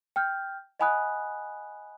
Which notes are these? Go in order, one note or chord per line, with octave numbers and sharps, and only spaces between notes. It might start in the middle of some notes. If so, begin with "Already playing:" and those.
G5 F6 G6
D#5 F#5 G#5 B5 D#6 F#6